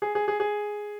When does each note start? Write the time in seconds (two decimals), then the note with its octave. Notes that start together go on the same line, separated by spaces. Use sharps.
0.02 G#4
0.15 G#4
0.28 G#4
0.40 G#4